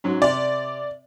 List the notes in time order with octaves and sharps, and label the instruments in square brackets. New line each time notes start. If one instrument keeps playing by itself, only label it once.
[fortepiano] G#2 F#3 C#4
[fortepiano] C3 [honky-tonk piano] D5